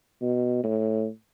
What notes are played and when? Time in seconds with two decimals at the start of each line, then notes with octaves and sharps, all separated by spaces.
0.22 B2
0.63 A2